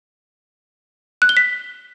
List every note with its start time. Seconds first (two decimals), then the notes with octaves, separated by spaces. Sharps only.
1.22 F#6
1.29 G7
1.37 B6